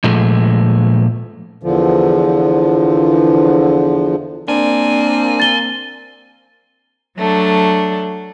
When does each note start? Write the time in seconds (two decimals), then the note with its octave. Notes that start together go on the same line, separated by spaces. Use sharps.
0.04 A#2 F3 G#3 A3
1.63 E2 D3 F3
4.48 A#3 C4 D4 G#5
5.40 A6 G7
7.17 F#3 A3 D4